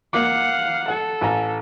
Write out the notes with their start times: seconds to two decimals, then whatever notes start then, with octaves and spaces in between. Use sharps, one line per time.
0.13 A#3 F5 F#5 D6
0.88 A4 F#5
1.21 A1 G#5 A#5